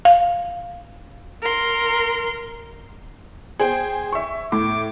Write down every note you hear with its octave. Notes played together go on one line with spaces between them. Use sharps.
F5
A#4 C6
G#4 C5 G5
E5 C#6
A2 D6